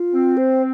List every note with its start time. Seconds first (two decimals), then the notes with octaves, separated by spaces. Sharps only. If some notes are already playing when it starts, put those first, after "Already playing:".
Already playing: F4
0.13 C4
0.37 C5